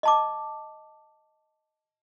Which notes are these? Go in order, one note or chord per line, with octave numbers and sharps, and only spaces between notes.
D#5 A5 D6